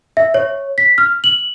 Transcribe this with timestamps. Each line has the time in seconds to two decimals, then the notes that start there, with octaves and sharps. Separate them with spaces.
0.17 E5
0.34 C#5
0.78 B6
0.98 F6
1.24 F#7